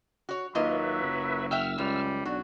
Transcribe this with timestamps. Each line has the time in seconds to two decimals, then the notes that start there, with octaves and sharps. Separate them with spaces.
0.29 F#4 C#5
0.55 D#2 F#3 A#3 F4 B4 D#5 E5
1.02 F#1
1.51 E5 F#5 G5 E6 F6
1.78 C#2 F#2 G3
2.26 B1 F#3 D4 F#4